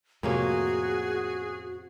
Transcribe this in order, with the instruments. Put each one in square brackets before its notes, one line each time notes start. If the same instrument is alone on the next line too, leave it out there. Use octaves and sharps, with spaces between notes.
[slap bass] F2 A2 [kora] C3 A#3 C#4 [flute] F#4 [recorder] G#4